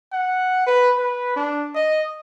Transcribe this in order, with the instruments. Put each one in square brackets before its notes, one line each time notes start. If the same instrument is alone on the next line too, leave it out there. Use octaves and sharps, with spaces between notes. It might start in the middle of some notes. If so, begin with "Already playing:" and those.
[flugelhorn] F#5
B4
B4
D4
D#5